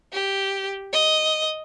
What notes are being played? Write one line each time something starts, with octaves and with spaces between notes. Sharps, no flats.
G4
D#5